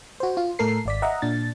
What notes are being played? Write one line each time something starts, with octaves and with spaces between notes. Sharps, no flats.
F#4 C5
F4
A2 A3 A4 A#4 C7
G#1 D5 B6
D#5 E5 F#5 A#5
A#2 D4 A6